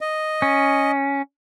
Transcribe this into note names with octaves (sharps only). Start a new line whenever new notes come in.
D#5
C#4